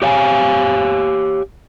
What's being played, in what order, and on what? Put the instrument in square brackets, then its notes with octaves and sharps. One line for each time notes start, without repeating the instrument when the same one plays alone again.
[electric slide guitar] G4 C#5 F5 G5 G#5